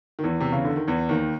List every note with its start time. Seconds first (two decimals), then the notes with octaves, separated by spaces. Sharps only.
0.19 D#3
0.24 E2 E3
0.41 C3
0.52 C#3
0.64 D3
0.76 D#3
0.87 E2 E3
1.09 D#2 D#3